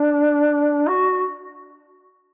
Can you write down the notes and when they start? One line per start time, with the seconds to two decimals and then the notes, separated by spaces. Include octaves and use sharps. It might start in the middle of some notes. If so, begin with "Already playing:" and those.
Already playing: D4
0.87 F#4